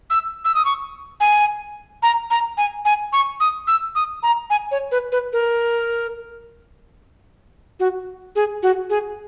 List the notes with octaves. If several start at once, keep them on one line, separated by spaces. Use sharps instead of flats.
E6
E6
D#6
C#6
G#5
A#5
A#5
G#5
G#5
C#6
D#6
E6
D#6
A#5
G#5
C#5
B4
B4
A#4
F#4
G#4
F#4
G#4